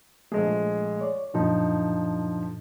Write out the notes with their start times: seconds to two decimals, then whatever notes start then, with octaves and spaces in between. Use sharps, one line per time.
0.32 A#1 G#3 A3 G#4
1.01 C#5 D5
1.34 F#2 A#2 D3 F3 D#4